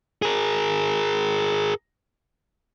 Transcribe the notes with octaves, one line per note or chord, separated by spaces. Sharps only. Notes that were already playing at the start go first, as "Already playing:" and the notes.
G#4 A#4